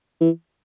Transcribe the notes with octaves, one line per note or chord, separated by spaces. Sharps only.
E3